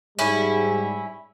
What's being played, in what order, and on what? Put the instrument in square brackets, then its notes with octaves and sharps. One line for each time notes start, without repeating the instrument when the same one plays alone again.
[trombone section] G#2 G3 [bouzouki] C#4 E4